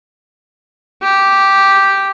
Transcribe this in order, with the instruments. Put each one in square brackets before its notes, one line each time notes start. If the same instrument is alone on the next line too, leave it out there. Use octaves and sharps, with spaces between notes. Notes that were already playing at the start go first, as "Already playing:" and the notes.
[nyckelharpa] G4